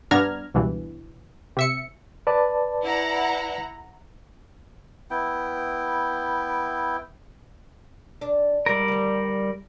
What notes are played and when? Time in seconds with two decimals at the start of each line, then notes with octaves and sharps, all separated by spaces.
0.11 G2 B3 D4 A#5 F6 G#6
0.54 C#2 G2 B2 E3
1.57 C3 E5 C#7
2.27 B4 D5 A5
2.83 E4 F#5 A#5
5.10 B3 E4 G5
8.21 D4
8.66 G3 G#3 A#4 E5
8.88 D2 D#3